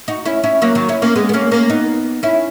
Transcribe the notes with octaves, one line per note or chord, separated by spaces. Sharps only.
D#4 F#4
C#4 E4
C#4 E4
F#3 A#3
D#3 F#3
C#4 E4
A#3 C#4
G#3 B3
B3
A#3 C#4
A#3 C#4
B3 D#4
C#4 E4